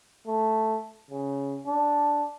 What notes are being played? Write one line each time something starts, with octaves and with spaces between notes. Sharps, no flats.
A3
C#3
D4